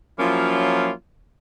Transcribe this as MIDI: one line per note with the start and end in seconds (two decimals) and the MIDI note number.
0.19 0.92 53
0.19 0.92 54
0.19 0.92 58
0.19 0.92 61
0.19 0.92 64
0.19 0.92 65